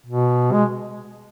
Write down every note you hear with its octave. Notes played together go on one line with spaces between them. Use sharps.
B2
G#3